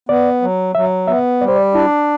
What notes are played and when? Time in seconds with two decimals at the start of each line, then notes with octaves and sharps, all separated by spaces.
0.09 B3 D5
0.42 F#3
0.75 F#3 E5
1.08 B3 E5
1.41 G3 D5
1.48 C5
1.56 D5
1.74 D4 E4